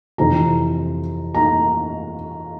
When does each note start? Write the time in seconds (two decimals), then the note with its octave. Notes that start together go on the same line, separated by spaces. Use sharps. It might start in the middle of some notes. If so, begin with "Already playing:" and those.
0.18 F2 C3 E3 A#5
1.34 A#5